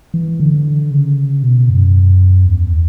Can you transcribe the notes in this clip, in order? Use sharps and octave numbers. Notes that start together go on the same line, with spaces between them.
E3
D3
C#3
B2
F#2
E2